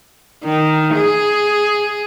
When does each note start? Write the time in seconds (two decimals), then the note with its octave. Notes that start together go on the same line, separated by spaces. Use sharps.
0.44 D#3
0.95 G#4